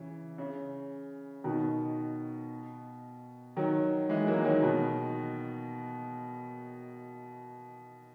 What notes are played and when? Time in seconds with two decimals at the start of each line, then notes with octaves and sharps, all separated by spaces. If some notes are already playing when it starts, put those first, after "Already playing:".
Already playing: C#3 E3
0.38 C#3
1.44 B2 D#3
3.57 D#3 F#3
4.09 E3 G#3
4.27 F#3 A#3
4.45 D#3 F#3
4.62 B2 D#3